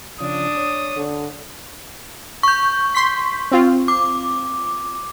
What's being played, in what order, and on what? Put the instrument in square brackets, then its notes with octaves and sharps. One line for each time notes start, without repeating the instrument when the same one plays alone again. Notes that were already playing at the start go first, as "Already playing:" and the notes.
[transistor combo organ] C#3 F3 [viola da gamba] D4 [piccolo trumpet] D#6
[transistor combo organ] C#5
[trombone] D3
[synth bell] C#6 G6
[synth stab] C6 B6
C4 F4
[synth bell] D6